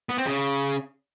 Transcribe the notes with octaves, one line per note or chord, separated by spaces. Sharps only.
B3
C4
C#3